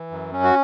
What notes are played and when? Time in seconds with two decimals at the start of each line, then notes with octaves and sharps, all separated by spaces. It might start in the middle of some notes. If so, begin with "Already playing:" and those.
Already playing: E3
0.11 F#2
0.33 C#4
0.43 F#4